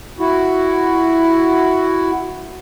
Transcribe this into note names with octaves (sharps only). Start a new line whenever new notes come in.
E4 F#4